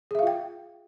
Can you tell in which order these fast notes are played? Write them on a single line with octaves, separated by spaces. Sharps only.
G#4 E5 F5 F4 G5